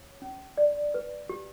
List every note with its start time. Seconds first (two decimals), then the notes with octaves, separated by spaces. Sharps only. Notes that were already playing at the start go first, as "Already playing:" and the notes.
Already playing: C#5
0.22 C#4
0.58 D5
0.94 B4
1.29 G4